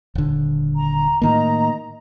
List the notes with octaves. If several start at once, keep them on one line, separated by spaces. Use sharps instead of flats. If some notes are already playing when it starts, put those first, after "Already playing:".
D#1 D3
A#5
A2 D#3 A#3 D#5 A#5